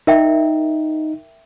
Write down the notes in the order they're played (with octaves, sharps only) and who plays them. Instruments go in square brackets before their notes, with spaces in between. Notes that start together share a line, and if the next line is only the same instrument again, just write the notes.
[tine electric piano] D#4 [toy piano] A#4 E5 G5